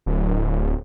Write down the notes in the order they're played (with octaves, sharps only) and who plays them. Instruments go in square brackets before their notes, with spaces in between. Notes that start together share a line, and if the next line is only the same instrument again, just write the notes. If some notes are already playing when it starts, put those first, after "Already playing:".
[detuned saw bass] D1